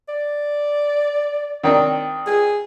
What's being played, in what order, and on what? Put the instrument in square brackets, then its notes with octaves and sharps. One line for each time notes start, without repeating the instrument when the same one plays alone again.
[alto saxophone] D5
[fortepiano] D#3 C4 D4
[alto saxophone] G#4